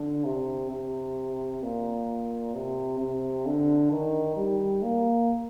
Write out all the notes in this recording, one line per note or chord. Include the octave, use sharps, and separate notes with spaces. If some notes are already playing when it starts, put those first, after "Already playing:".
Already playing: D3
C3
C3
A#2
C3
C3
D3
D#3
G3
A#3